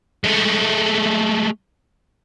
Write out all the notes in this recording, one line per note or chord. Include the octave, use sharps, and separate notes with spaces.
G#3 A3